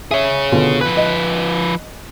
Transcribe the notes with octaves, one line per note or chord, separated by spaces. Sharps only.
G#4 C#5 E5
B2 D3 F4
F3 B4 F#6
D#5